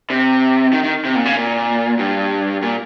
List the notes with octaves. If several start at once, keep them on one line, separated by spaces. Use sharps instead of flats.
C3
D#3
D#3
C3
A#2
C#3
A#2
G2
A#2